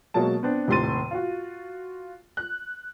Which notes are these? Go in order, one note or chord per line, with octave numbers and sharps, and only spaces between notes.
B2 F#3 G#3 A#3 A5
B3 C4 D4
D#1 A2 C3 C6 A6 D#7
F4 F#4
F#6